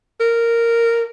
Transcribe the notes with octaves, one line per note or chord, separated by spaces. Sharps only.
A#4